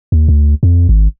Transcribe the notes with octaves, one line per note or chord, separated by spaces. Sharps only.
D#2
D2
F2
G#1